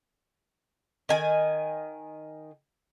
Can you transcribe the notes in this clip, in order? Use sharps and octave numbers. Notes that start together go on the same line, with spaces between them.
D#3 G#5